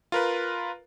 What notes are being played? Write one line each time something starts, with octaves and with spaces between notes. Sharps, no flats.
F4 A#4 B4